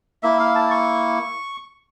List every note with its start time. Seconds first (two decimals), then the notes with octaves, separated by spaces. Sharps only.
0.23 A#3 E4 E5
0.40 F5
0.55 A5
0.71 C#6